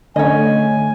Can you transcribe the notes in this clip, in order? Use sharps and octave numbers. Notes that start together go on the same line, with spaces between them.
D3 A3 C#4 C#5 D#5 G#5